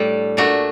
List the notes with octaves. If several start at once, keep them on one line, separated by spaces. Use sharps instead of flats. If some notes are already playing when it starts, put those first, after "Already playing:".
Already playing: A2 G3 A3 D4
A#2 A3 D4 F#4